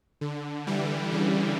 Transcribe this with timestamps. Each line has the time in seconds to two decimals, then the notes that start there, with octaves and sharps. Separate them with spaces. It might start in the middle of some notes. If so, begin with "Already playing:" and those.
0.21 D3
0.67 E3 G3
1.12 C#3 E3